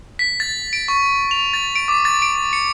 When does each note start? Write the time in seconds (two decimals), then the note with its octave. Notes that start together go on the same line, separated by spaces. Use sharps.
0.19 B6
0.40 A6
0.73 D7
0.88 C#6
1.31 F7
1.53 A6
1.76 D7
1.88 D6
2.05 A6
2.22 D7
2.53 C#7